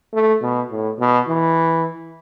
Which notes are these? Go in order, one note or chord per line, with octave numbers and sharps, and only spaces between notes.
A3
B2
A2
B2
E3